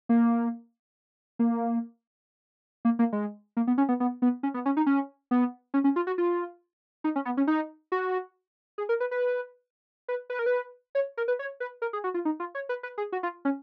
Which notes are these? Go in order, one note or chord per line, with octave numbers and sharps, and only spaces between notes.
A#3
A#3
A#3
A#3
G#3
A#3
B3
C#4
B3
B3
B3
C#4
B3
C#4
D#4
C#4
B3
C#4
C#4
F4
F#4
F4
D#4
C#4
B3
C#4
D#4
F#4
G#4
A#4
B4
B4
B4
B4
A#4
B4
C#5
A#4
B4
C#5
B4
A#4
G#4
F#4
F4
D#4
F4
C#5
B4
B4
G#4
F#4
F4
C#4